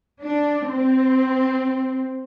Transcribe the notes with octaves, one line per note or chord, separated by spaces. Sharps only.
D4
C4